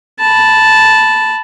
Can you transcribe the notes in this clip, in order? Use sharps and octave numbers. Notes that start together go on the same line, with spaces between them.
A5 B5